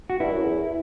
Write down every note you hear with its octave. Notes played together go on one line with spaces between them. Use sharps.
F#4
G2 E4
F#2
E2